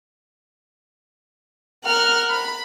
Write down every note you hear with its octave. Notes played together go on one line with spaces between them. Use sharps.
A#4 F#5 F6
B5